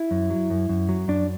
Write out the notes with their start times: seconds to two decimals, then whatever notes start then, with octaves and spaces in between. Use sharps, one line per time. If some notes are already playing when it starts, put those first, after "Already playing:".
Already playing: E4
0.11 F#2
0.30 F#3
0.50 F#2
0.69 F#2
0.89 F#3
1.08 F#2 D4